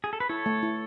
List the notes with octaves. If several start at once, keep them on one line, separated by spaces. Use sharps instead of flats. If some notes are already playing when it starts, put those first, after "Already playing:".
G#4
A4
B4
E4 A4 C#5
A3
E4